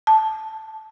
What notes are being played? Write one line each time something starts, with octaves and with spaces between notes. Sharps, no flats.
A5